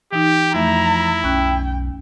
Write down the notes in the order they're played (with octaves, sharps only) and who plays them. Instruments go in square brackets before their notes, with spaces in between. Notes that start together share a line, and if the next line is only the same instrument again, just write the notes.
[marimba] E3 D#4 [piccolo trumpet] G4
[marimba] F2 A3 E5 [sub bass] F3 [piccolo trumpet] E4 [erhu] A#5
[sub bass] B1 [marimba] C#4 F#6 [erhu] G5